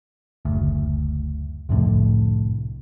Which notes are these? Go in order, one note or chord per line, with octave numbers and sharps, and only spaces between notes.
F#1 D2
C2 F2 A2 D3